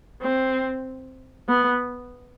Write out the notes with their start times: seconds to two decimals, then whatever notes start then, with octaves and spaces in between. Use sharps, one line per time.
0.22 C4
1.49 B3